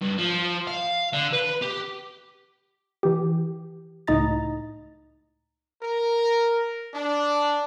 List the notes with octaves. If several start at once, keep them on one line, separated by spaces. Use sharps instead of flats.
G2
F3
F5
D3
B4
G4
E3 G4
C#2 A2 D#4 D#5 A#5 A6
A#4
D4